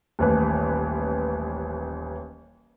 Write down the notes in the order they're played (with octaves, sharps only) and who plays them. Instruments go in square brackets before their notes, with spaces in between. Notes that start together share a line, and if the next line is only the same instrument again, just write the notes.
[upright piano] D#1 A1 B4